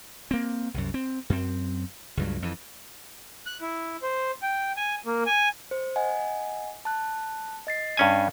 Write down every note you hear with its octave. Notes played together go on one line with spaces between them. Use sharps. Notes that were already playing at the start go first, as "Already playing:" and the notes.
A#3 C4
C2 F#2
C4
F#2 C4
C#2 G2 F#3
F2 E3
F#6
E4
C5
G5
G#5
A#3
G#5
C5
D#5 F#5 G#5
A5 F#6
D#5 A6 C7
G2 C#4 G#5